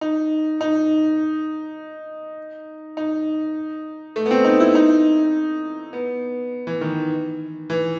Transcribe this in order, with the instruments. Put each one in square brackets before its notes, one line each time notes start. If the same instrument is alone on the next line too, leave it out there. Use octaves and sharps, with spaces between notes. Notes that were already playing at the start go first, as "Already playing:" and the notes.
[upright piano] D#4
D#4
D#4
A3
B3
C4
D#4
E4
D#4
B3
E3
D#3
E3